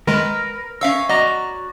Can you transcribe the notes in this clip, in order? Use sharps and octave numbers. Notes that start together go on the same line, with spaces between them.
D#3 G#3 A#4 B4
C#4 C#5 E5 F5 E6
F#4 D5 D#5 A#5